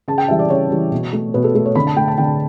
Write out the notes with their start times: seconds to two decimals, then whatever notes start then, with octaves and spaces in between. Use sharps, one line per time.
0.08 C#3 A5
0.18 G5
0.28 E3 G3 E5
0.39 D5
0.50 C#3 C#5
0.70 E3 G3
0.91 B2
1.13 A3
1.34 B2 B4
1.44 A4
1.55 A3 A4
1.65 C#5
1.75 D3 B5
1.87 A5
1.97 A3 G5
2.08 A5
2.18 D3 G5